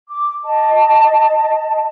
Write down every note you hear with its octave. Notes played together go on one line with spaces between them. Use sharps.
D6
D#5 A5